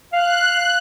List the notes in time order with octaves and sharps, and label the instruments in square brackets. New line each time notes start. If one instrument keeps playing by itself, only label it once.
[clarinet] F5 [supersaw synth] F#6